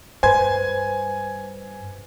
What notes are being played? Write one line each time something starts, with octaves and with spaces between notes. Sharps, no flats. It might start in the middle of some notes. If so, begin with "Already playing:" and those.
G2 B4 C5 G#5 G#6